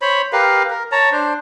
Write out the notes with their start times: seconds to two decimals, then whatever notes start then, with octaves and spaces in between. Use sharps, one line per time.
0.02 C5 C#5 B5
0.33 G4 A#4 B4 F5
0.70 A#4
0.92 C#5 A5 A#5
1.12 D4 C5